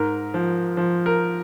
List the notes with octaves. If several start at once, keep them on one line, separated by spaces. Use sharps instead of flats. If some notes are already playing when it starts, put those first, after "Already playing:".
Already playing: G#2 A#4
F3
F3
A#4